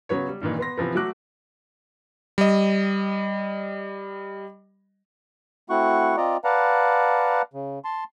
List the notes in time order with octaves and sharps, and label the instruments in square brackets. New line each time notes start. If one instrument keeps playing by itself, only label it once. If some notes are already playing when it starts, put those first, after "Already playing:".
[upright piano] C#3 F#3 B3 C#5
G3
G2 A#2 D#3 E3
B3 C6 A#6
C3 E3 F3 B3
F#3 A3 F#4 D6 F#6
[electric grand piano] G3 D#5
[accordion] A3 C4 E4 F#4 F#5 C#6
C4 F4 D5 D#5 A#5
B4 D5 F5 F#5 A5 A#5
C#3
A5 C6